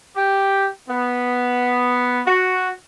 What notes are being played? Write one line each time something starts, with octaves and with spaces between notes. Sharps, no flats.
G4
B3
F#4